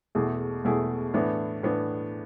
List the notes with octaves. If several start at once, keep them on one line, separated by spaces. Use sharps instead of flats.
E2 B2 A3 E4 G#4
E2 B2 A3 E4 G#4
A2 E3 B3 D4
A2 E3 B3 D4